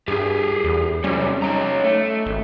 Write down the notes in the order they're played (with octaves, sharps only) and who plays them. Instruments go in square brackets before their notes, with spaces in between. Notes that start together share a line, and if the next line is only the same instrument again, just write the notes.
[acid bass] G2 [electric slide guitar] G4 G#4
[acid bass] E2
[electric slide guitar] C3 F#3 G3 [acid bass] C#4
[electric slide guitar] D#4 C#5 A#5
A3
[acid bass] G#1